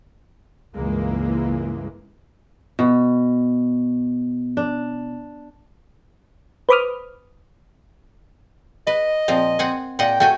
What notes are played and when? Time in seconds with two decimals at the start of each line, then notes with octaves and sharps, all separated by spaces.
0.74 C#2 G2 E3 G#3 A#3
2.79 B2
4.57 D4
6.69 B4 C5 B5 D6 D#6 F6
8.87 B4 D#5
9.28 A#2 F3 C4
9.59 C4 F#5 G#5
9.99 A#2 D#5 F#5 G5
10.20 A3 F#4 G5 G#5